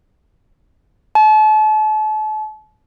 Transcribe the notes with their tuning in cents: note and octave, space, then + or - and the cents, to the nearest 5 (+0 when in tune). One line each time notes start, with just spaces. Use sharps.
A5 -40